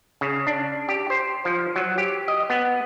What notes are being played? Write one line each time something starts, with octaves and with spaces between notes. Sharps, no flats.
C#3
D4
G4
C5
F3
F#3
G4
D#5
B3